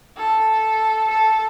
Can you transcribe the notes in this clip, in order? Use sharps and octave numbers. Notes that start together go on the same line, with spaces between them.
A4
A4